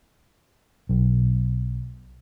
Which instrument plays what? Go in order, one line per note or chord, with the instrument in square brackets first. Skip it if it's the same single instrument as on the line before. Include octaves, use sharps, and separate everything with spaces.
[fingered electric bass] B1